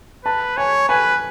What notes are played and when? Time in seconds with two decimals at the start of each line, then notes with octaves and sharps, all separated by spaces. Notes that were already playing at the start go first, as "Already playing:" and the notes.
0.25 B4 A5
0.57 C#5 G#5
0.89 B4 G#5